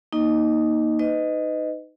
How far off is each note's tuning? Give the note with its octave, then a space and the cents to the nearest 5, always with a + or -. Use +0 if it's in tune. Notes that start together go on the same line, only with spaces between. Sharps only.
A#3 +10 D#4 +0 D#5 -5
D#4 +0 B4 +35 D#5 +0